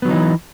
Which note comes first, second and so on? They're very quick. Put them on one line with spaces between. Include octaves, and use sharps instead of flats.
B3 F#3 D#3 D#4 E3